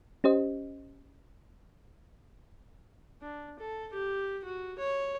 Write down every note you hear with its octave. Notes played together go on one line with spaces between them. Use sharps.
C#4 G4 C5 D#5
D4
A4
G4
F#4
C#5